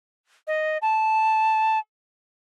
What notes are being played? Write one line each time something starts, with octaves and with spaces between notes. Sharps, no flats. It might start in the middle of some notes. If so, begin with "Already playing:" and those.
D#5
A5